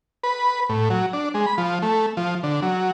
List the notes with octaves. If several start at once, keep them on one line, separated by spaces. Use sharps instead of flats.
B4
A2
F#3
D4
G#3
B5
F3
A3
F3
D3
F#3